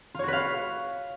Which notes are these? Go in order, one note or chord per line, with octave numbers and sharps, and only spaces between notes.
F4 F#4 B4 C#5 F5